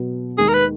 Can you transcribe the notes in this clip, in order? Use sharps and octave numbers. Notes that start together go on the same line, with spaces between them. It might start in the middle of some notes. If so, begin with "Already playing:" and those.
Already playing: B2 F#3 B3
D#2 D#3 G#3 G#4
A#4
B4